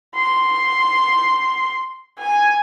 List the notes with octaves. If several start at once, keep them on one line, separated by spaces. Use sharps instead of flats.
C6
G#5